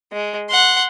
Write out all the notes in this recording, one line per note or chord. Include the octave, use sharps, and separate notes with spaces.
G#3
F#5 C6